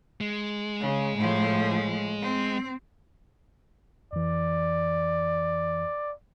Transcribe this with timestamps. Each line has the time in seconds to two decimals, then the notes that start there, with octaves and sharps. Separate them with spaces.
0.21 G#3
0.80 C#3
1.16 A2 F3
2.21 C4
4.13 F2 E3 D5